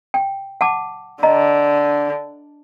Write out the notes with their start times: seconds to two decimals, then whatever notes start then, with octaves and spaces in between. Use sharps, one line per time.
0.14 G5
0.61 F#5 A5 D6
1.23 D3 D#5 A#5